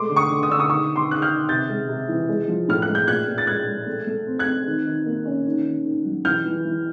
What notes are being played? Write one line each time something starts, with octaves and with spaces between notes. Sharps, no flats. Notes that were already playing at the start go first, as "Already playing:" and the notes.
Already playing: G#3 A3 C6 D6
D3
C#6 D#6
D3
D#6
D3 E6
C#6 D#6
D#3 C#6 D#6
D#3
C6 D6
D#3 F#6
F6 G6
D#3
C3 G6 A6
G#3
C3
E3
G#3
F3
A2 F6
F#6
G#3
G6
A#2 F#6 G#6
A#2
A6
G#3 F#6 G#6
G#3
A3
A3
C4
F#6 G#6
C4
D#3
D#3
A#3
C#4
D#3
D#3
D#3
F#3
E3 F6 G6
E3
E3